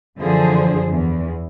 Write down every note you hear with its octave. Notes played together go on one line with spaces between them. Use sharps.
F#2 D3 E3 F3 G#4 C5
E2